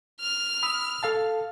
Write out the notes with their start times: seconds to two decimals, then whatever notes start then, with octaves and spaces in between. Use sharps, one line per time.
0.20 F6
0.63 B5 D#6 E6
1.03 A4 F5 A5